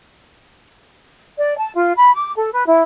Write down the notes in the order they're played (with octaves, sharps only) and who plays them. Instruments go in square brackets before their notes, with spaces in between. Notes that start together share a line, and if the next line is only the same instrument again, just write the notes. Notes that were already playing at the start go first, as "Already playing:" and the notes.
[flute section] D5
A5
F4
B5
D6
A4
B4
E4